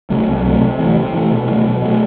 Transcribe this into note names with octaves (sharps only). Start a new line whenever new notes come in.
C3 F#3 A3
C2
C3 F#3 A3
C3
E3 A3
C3
E3 A3
B2
F#3 A3
B2
F#3 A3